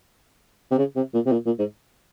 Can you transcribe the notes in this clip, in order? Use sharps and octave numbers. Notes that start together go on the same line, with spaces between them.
C3
C#3
C3
A#2
C3
A#2
A#2
G#2